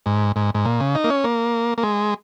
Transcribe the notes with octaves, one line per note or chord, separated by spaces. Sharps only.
G#2
G#2
G#2
A#2
C#3
D#4
A#3
C#4
A#3
A#3
G#3